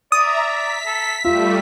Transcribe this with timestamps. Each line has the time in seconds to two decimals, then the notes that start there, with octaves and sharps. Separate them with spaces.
0.12 D5 E5 A#5 D#6
0.42 B6
0.86 A4
1.25 G3 A3 F4 E5